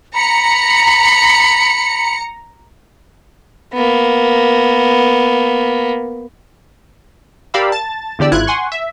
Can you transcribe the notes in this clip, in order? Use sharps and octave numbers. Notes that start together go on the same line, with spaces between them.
A#5 B5 C#7
A#3 B3
G4 A#4 D5 F5 B5 E6
A5 A6
E2 D3 G4 D5 E6
G#1 G#2 E4 F4 F#6 G#6
F#5 G#5 C6 C#6
E5